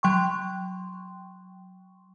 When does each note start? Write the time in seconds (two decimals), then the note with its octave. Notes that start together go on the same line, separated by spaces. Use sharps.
0.03 F#3 G5 C6 C#6